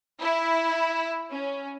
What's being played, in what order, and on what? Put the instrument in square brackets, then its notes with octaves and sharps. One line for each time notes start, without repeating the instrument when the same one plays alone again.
[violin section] E4
C#4